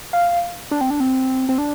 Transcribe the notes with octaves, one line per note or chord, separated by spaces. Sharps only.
F5
D4
C4
D4
C4
C4
D4